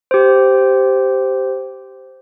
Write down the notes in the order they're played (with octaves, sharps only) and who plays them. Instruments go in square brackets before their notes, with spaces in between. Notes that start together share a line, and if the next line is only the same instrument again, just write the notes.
[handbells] G4 C5